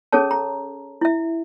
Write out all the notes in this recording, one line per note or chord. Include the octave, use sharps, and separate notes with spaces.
C#4 G#4 A4 C#5 A5
A#5
E4 E5